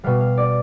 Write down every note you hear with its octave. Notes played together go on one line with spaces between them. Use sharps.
B2 G3 F5
F5
D5